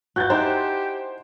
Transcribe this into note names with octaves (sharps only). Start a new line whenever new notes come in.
E4 F#4 F#6 G6 A6
D#4 E4 G4 C5 G#5